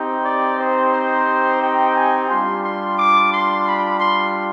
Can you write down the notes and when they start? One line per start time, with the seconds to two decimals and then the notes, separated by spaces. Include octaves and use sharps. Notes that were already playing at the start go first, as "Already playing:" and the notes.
Already playing: C4 D#4 G4
0.24 D5
0.58 C5
0.93 C5
1.62 G5
1.96 G#5
2.29 G3 D4 F4 C6
2.64 C6
2.98 D6
3.32 C6
3.66 B5
4.00 C6